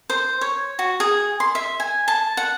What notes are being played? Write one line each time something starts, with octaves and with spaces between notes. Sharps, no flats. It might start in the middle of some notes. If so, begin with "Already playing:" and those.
C5
C#5
F#4
G#4
C6
E5
G#5
A5
F#5